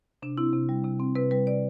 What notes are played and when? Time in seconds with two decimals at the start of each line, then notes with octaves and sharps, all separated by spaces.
0.22 C3 D4
0.37 C4 E4
0.53 C3
0.69 G3
0.85 C3
1.00 C4
1.16 C3 B4
1.31 G3 B4
1.47 C3 D5